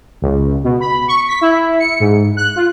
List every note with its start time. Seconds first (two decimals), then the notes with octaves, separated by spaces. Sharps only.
0.22 C#2
0.64 B2
0.80 B5
1.08 C#6
1.28 B6
1.41 E4
1.80 C#7
2.00 G#2
2.37 F#6
2.56 F4